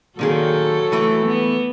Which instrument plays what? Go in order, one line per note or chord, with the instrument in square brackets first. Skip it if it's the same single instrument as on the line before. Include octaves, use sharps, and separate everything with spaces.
[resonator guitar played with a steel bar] A#2 D#3 G#4 [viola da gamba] F#3 A4
[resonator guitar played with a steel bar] E3 A3
[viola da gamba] B3